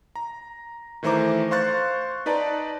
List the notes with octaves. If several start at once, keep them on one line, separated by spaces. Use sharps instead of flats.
A#5
D#3 E3 A3 C5 A#5 D6
C5 F5 C6 C#6 F#6 A6
D#4 B4 D5 A5 A#5